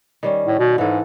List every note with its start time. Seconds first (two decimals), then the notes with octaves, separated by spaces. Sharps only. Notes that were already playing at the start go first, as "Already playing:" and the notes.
0.23 D#3 G3 C#4
0.47 A2
0.59 B2
0.78 G#2 E3 A4